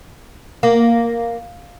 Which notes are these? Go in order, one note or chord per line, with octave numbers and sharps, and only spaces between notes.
A#3